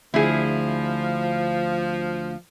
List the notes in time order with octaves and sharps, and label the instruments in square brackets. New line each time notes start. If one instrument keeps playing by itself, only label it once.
[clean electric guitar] D2 [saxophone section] F3 [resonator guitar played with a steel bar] E4 G#4